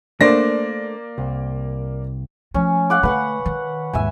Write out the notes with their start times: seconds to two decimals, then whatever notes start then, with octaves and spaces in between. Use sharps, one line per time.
0.21 A3 A#3 D4 C5 D5 A#6
1.18 C2
2.54 F3 A3 C#4
2.90 F5 F#5 D6
3.03 D3 A3 B4 F#5 C#6
3.46 D#3
3.93 D#2 G#2 E5 G#5